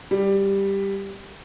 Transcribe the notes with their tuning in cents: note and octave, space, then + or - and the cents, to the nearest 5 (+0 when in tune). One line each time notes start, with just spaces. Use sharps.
G3 +5